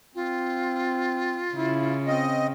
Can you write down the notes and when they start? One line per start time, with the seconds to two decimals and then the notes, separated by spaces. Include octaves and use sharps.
0.15 C4 F4
1.55 C#3 E4
2.07 C4 D#5